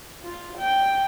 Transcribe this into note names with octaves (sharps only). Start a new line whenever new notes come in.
F4
G5